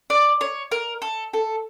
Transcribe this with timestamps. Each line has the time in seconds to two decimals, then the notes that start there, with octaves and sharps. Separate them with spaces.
0.10 D5
0.41 C#5
0.71 A#4
1.02 A4
1.33 A4